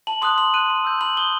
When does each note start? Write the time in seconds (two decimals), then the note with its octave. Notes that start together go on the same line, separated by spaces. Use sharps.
0.07 A5 F#7
0.22 C6 D#6 F#6 F#7
0.37 C6 F#7
0.54 F#6 D#7
0.70 C6
0.85 E6 G6
1.01 B5 F#7
1.17 D#6 G6 G7